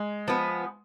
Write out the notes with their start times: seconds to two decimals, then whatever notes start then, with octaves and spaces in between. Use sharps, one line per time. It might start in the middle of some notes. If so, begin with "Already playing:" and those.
Already playing: G#3
0.28 F3 B3